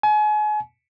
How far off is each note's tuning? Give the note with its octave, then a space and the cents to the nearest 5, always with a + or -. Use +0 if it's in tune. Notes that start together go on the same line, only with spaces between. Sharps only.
G#5 +35